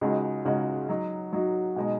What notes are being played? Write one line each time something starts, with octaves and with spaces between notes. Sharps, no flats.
C#2 C#3 G#3 D#4 F#4
C#2 C#3 G#3 D#4 F#4
F#3 D#4 F#4
F#3 D#4 F#4
B2 G#3 D#4